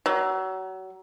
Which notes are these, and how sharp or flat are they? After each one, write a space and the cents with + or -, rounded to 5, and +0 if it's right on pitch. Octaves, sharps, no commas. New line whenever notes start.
F#3 +30